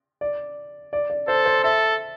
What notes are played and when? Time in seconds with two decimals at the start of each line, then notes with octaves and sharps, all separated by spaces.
0.21 D5
0.93 D5
1.10 D5
1.28 A4 C5
1.46 C5
1.63 A4 E5